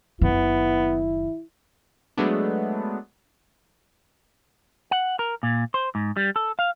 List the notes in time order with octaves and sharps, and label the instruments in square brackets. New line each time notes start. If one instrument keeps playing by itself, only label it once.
[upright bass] F#1 D#3 [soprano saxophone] B3 [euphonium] E4
[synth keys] F#3 G#3 A3 B3 D4
[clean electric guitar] F#5
A#4
A#2
C5
G#2
G3
A4
F5